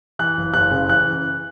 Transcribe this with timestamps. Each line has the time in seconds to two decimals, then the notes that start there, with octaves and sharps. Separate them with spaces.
0.19 E3 F#6
0.37 F#1
0.54 F#1 F#6
0.71 C#3
0.89 E3 F#6